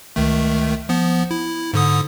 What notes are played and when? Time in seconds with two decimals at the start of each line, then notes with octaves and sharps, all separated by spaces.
0.16 C#2 D#3 A3
0.89 F3 B3
1.31 E4
1.73 G#2 D3 D#6